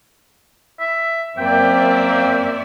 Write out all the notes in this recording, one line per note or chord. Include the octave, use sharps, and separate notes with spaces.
E5
F#2 A#3 C4 D5 E5 G5